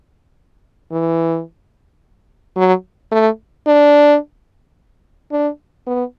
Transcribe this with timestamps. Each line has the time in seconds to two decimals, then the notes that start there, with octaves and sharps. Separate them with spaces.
0.92 E3
2.57 F#3
3.12 A3
3.67 D4
5.32 D4
5.87 B3